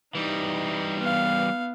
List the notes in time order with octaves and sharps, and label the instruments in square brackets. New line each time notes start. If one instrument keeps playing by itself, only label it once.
[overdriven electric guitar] E3 G3 [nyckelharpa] D#4
[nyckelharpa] B3 F5